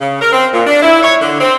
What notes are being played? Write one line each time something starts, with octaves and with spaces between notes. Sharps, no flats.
C#3
A#4
C4
A#2
D4
E4
C#5
D3
C4